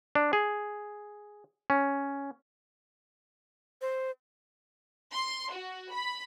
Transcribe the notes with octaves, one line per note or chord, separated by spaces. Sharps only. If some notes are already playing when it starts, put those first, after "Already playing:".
D4
G#4
C#4
C5
C6
F#4
B5